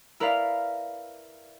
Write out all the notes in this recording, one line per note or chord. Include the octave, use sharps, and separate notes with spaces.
E4 A#4 B4 D5 F5